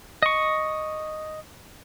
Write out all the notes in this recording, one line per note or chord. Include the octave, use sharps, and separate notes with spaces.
D#5 C#6